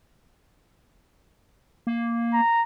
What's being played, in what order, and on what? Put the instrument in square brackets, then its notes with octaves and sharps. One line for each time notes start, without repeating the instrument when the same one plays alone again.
[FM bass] A#3
[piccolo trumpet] A#5